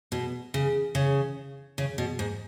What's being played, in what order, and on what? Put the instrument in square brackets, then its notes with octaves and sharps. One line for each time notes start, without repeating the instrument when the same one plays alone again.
[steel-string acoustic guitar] B2
C#3
C#3
C#3
B2
G#2